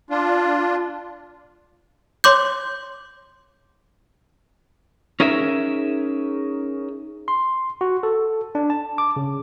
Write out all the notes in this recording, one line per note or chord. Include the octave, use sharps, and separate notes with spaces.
D4 F4
C#5 C6 D6 G6
C#4 D#4 G#4 A#4 E5
C6
F#4
A4
D4
A5
D6
C#3